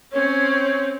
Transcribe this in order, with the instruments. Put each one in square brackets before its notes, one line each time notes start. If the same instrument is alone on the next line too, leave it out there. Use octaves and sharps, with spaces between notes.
[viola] C4 C#4 [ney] C#5